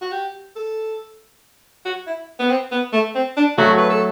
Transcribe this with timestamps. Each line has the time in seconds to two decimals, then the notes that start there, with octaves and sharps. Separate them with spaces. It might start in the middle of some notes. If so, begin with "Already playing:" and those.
0.01 F#4
0.12 G4
0.56 A4
1.85 F#4
2.07 E4
2.39 B3
2.50 C4
2.72 B3
2.93 A3
3.15 C4
3.37 D4
3.58 F#3 A3 F#4
3.78 B4
3.90 A4